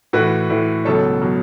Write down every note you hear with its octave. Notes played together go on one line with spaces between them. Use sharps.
A2 E3 F#4 B4
A2 E3
C#2 B2 F#3 A4 C#5
B2 F#3